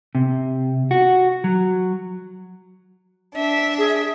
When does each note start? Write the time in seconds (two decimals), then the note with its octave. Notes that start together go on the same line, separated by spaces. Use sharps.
0.15 C3
0.91 F#4
1.44 F#3
3.35 D4 E5
3.78 G#4